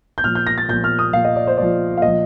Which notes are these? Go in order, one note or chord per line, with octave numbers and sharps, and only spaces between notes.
G6
A#2 F3 F6
G6
A#6
A6
A#2 F3 G6
F6
D#6
A#2 F3 F5
D#5
D5
C5
A#2 F3 D5
F5
A#2 F3 D#5